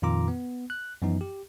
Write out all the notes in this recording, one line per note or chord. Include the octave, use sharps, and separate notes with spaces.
F2 A#2 D#3 F4 A#5 D6
B3
F#6
F#2 E3 F3 B3 D#4
G4